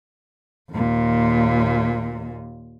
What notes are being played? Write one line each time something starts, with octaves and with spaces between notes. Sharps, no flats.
D#2 A#2